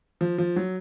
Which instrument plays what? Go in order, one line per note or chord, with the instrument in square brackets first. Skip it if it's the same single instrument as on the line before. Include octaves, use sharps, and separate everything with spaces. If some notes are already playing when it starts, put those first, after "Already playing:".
[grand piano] F3
F3
F#3